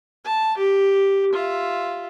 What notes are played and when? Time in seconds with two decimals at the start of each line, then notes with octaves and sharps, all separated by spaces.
0.25 A5
0.57 G4
1.32 F4 E5